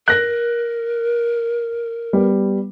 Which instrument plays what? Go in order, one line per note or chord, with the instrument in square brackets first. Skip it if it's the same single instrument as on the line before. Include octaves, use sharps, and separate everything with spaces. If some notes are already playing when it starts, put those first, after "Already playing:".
[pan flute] A#4 [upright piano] F#6 A#6
[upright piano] G3 B3